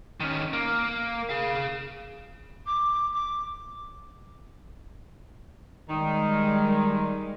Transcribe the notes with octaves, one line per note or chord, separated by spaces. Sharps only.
D#3 C#4
A#3
G#4 F5
D6
D6
D#3 G3 G#3